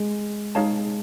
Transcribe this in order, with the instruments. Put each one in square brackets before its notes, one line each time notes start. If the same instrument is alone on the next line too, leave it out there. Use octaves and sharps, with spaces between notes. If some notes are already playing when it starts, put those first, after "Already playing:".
Already playing: [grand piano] G#3
[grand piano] G#3 [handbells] D#4 G#4 C#5 F5 A5